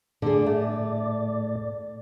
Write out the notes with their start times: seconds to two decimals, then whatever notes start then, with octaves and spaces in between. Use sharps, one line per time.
0.22 A2 D3 G#4 D5
0.46 A3